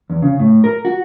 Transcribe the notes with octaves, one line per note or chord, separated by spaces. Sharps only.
E2
C#3
A2
A#4
F#4